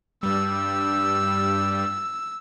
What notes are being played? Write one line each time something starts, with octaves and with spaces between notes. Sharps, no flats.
G2 G3 E6